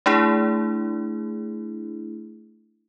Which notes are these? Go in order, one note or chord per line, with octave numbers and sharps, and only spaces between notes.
A3 D4 E4 G#4